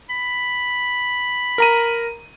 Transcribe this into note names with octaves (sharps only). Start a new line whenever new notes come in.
B5
A#4 A#5 D#7